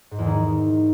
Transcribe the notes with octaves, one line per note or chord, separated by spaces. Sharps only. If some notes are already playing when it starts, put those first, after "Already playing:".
G#2
E2
D#3